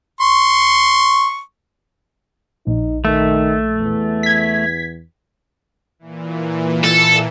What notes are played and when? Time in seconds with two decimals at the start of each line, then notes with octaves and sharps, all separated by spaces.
0.21 C6 C#6
2.67 A#1 D#4
3.05 D#3 A3
3.78 E2
4.23 G#6 B6
5.99 A#2 E3
6.83 A4